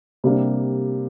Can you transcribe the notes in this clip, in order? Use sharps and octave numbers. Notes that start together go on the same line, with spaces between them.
C3 G3 A#3 D4